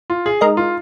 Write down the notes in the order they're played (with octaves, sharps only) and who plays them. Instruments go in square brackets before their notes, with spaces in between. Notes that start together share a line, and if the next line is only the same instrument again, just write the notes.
[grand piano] F4
G#4
[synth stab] G#3 D#4 A#4 D#5
[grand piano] F4